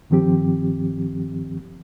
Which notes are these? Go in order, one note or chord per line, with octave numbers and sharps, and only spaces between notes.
G2 D#3 F3 C4 G4